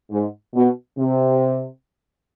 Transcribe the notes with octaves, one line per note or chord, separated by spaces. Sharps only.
G#2
B2
C3